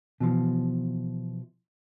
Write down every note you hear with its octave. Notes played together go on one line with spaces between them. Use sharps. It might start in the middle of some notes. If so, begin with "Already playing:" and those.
B2 E3 F3